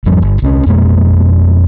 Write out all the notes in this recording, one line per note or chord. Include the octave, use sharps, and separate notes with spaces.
G#1 F2 F3 G3
G1
C2 C#4
F2 B2 G#3 A#3